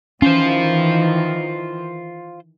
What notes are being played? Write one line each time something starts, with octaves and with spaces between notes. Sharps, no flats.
D#3 E3 C#4 F4 C5